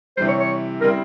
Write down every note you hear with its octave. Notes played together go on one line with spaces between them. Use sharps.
C3 E3 G3 C5
C#5
C#5
C#3 G3 C4 E4 A#4